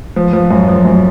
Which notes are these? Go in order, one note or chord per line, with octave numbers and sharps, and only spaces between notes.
F3
F3
F#2
F3
F#2